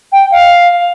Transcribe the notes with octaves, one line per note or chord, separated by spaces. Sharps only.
G5
F5